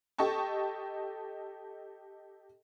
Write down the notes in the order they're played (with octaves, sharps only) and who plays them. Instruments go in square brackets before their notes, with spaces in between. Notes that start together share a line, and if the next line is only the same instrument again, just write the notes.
[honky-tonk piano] G4 A4 D#5 A5 C#6